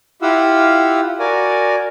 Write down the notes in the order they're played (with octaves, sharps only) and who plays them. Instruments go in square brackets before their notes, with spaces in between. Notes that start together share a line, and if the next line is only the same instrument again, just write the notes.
[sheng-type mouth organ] E4 F4 G4 F5 F#5 E6
F#4 A#4 D5 G#5